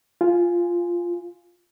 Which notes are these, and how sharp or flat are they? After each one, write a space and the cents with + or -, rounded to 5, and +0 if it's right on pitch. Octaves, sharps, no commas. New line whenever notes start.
F4 -5 G#5 +0